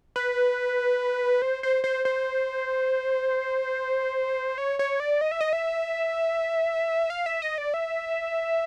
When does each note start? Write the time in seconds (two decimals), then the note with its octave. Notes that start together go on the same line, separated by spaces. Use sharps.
0.16 B4
1.42 C5
1.63 C5
1.84 C5
2.05 C5
4.58 C#5
4.79 C#5
5.00 D5
5.21 D#5
5.31 E5
5.41 D#5
5.53 E5
7.10 F5
7.26 E5
7.42 D#5
7.58 D5
7.74 E5